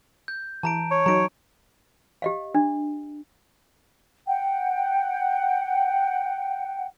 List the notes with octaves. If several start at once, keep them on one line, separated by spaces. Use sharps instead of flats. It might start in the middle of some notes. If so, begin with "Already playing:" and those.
G6
E3 A5 A#5 D7
C#5
F#3 D#4 A#5 D7
G4 D#5 F5
D4
F#5 G5